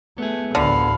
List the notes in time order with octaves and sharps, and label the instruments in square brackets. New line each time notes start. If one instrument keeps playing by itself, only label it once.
[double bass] A3 [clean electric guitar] B3 G#4
[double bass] A1 D2 [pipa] D3 [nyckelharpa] F5 B5